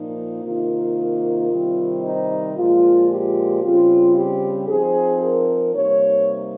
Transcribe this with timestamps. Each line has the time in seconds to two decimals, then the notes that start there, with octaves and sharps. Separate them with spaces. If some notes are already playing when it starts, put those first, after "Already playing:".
Already playing: A#2 F3 A#3 D#4
0.43 C3 D#3 A#3 D#4 F4
1.49 C3 D#3 G3 C4
2.03 D#4
2.56 A#2 F3 G#3 F4
3.09 G4
3.62 C#3 G3 C4 F4
4.16 G4
4.68 F3 C4 D#4 G#4
5.21 A#4
5.75 C3 G3 A#3 D#4 C#5